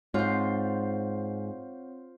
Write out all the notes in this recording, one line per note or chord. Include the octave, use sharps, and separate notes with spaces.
G#2 C4 F4 C5 C#5